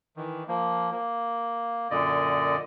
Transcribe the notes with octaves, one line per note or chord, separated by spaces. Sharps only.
D#3 E3
F3 A#3
A#3
F#2 A#2 D3 D5 D#5